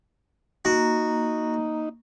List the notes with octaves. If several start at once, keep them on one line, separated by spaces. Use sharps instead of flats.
A#3 D#4 F#4 A#5